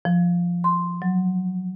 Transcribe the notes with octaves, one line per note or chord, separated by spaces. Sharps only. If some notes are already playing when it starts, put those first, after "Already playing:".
F3
C6
F#3